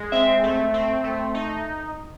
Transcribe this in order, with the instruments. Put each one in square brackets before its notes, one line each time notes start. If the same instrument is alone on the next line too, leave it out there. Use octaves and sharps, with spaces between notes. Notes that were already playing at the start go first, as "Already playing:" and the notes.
Already playing: [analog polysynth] G#3
[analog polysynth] C4 [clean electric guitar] E5
[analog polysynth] A3
C4
A3
D#4